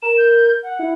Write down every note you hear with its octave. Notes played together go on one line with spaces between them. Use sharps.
A#4 E7
G6
F#5
E4